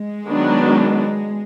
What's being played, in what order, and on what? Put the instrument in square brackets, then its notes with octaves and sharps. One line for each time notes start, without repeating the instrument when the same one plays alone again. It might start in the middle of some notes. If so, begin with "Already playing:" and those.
Already playing: [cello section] G#3
[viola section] D#3 F#3 B3 D4